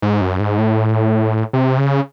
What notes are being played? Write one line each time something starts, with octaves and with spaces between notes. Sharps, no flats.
G#2
F#2
G#2
A2
C3
C#3